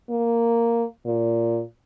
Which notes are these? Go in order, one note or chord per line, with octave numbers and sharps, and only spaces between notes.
A#3
A#2